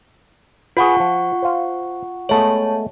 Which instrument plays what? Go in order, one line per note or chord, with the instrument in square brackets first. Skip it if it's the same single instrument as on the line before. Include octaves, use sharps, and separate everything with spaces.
[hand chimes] F4 F#5 C#6 [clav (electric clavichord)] G#4 B4
[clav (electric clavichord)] F3
C5 F5
[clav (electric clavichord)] G#3 A3 B3 [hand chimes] C#5 A5